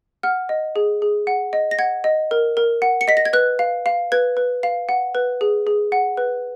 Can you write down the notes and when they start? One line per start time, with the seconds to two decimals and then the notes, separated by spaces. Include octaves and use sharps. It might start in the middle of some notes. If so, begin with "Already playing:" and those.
0.23 F#5 F6
0.49 D#5
0.76 G#4
1.02 G#4
1.27 F#5
1.53 D#5
1.71 A#6
1.79 F#5 G#6
2.04 D#5
2.31 A#4
2.57 A#4
2.82 F#5
3.01 C#7
3.08 D#5 B6
3.17 A#6
3.25 G#6
3.33 B4 F#6
3.59 F5
3.86 F5
4.12 B4 G#6
4.37 B4
4.63 F5
4.89 F#5
5.15 B4
5.41 G#4
5.67 G#4
5.92 F#5
6.17 B4